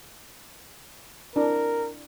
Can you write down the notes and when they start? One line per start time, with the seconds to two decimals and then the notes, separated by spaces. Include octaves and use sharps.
1.36 C4 D4 E4 A#4